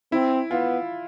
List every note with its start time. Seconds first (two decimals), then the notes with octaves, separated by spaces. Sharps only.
0.12 C4 E4
0.51 B3 F4